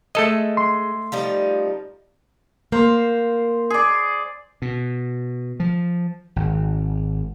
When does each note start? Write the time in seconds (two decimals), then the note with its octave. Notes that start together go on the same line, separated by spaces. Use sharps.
0.15 G#3 A3 A4 D#5
0.57 C6
1.12 F3 G3 D#4
2.72 A#3 C5
3.70 G#4 D5
4.62 B2
5.60 F3
6.36 G#1